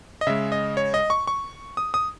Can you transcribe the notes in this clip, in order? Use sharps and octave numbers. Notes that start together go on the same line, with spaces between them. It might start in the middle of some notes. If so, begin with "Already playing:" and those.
D#5
C#3 G#3 E5
D#5
C#5
D#5
C#6
C#6
D#6
D#6